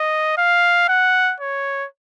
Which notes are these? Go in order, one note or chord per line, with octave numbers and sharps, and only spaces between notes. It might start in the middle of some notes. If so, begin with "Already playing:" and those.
Already playing: D#5
F5
F#5
C#5